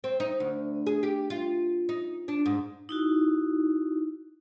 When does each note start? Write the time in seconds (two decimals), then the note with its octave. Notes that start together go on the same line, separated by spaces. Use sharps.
0.04 C4
0.20 D#4
0.40 D2
0.87 G#4
1.03 G4
1.30 F4
1.89 D#4
2.28 D4
2.46 G#2
2.89 D#4 E4 F#4